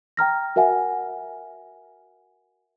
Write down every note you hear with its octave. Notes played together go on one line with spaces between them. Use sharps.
G5 A#5 F6 A#6
F#4 A#4 E5 F#5 G#5